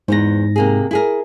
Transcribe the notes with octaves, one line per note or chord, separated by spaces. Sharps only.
E2 G#2 B3 C5 A#6
C3 A#3 G#4
E4 G#4 A#4